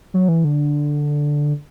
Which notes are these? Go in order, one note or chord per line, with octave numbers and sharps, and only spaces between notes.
F#3
E3
D3